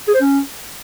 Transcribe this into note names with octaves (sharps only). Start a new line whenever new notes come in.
G#4
C5
C#4